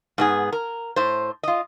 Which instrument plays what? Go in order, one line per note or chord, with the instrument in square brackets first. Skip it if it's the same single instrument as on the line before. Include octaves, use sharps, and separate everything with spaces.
[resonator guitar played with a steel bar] G#2 B3 G#4
A#4
A2 C5
F4 D#5